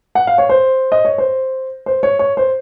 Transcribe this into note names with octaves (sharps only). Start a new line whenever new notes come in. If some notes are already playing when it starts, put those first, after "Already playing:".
F#5
F5
C#5
C5
D#5
C#5
C5
C5
C#5
C#5
C5